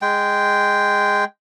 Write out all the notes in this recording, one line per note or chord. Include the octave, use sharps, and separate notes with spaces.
G#3 G5